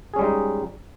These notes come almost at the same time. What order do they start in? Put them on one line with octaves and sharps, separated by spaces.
G#4 C#4 G3 G#3 D#4